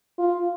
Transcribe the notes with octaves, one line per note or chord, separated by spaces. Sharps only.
F4